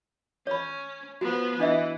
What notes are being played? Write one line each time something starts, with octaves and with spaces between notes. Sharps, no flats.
C#4 C#5 B5
F3 B3 F#4
E3 D4 D#5 E5